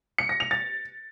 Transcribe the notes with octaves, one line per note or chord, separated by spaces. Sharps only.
C#7
A#6
F7
A6